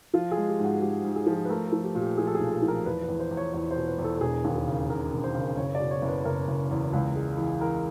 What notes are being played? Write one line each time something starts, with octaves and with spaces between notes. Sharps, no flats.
F3 F4
G#4
G#3
G4
G#2 F#4
G#3 G4
G#2
G#4
F3
B4
A3 A#4
A4
F3
G4
A#2
G4
F3 G#4
A4
G#4
B1
A4
F3
A#4
E2 B4
B4
E2
C5
E2
C#5
E2 C#5
C5
B2
B4
E2
A4
A4
E1 G#4
D#2
G#4
C#3
C#3 A#4
E1
C5
C#3
F#1 C#5
D5
B2
C#5
F#1
B4
F#1 A#4
F#1
E2
C#2
G#3
E3
E3 A#4